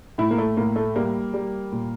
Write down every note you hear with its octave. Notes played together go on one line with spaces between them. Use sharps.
A2 E4
A#3
A3
A2 A#3
A3
G3 A#3
G3
A#2